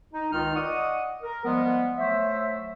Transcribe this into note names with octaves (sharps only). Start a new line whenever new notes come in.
D#4
C#2 D#3 D#4 F4 F6
D5 D#5 F#5 C#6 D#6
A#4
F3 G3 G#3 B3
F#3 A3 C5 E5